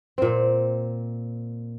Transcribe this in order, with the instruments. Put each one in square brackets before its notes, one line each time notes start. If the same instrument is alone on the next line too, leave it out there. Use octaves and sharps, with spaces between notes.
[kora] A#2 C4